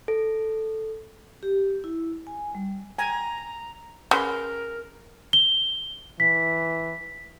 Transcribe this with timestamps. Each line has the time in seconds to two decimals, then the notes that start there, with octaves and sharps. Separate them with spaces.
0.08 A4
1.43 G4
1.84 E4
2.27 G#5
2.55 G3
2.98 G5 G#5 A#5
4.11 C#3 A#4 B4 F#5 C6
5.33 G7
6.20 E3 B6